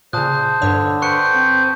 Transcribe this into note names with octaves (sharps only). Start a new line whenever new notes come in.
A#2 C#3 C5 A5 D#6 F#6
G2 D3 C#5
B4 C5 G5 C#6 F#6 C#7
C4